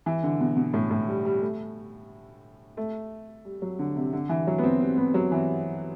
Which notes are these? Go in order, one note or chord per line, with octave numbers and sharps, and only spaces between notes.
E3
D3
B2
B2
A2
A2
G3
G3
A3
A3
G3
F#3
D3
C3
D3
E3
F#3
B3
C4
C4
B3
F#3
E3